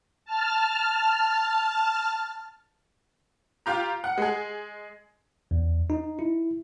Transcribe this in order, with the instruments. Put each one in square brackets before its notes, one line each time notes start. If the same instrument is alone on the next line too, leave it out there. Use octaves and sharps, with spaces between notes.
[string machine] A5 F6
[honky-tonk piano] F4 G4 A#5
F#5
G#3 G#4
[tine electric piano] E2
D#4
E4